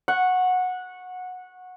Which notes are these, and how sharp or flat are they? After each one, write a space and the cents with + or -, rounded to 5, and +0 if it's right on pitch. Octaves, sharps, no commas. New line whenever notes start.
F#5 -15 C#6 -15